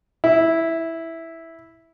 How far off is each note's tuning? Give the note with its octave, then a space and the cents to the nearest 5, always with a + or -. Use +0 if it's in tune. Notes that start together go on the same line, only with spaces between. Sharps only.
E4 -5